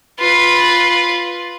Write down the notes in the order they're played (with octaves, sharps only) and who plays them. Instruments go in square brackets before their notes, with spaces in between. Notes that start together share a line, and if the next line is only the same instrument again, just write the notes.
[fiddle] F4 B4